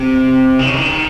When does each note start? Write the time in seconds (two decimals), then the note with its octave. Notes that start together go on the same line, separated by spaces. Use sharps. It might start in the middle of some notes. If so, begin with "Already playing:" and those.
Already playing: C3
0.59 D#3
0.66 C#3
0.74 D#3